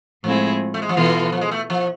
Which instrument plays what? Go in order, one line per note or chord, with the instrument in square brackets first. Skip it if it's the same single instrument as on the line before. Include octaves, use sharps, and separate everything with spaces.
[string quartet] A2 G#3 C4 E4 G#4 [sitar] F3
[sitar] A3
G#3
F3
[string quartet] B2 B3 F4 A4 [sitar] E3
[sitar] F3
G#3
A3
F3